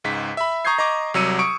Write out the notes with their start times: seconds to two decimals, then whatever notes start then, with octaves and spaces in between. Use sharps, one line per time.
0.04 C#2 G#2 B6
0.37 E5 B5
0.65 A#5 C#6 D#6 G6 G#6 C7
0.78 D#5 A#5 C#6 D6
1.14 C2 F#3 E6 C#7 D#7
1.39 C#6 D#6 C#7 D7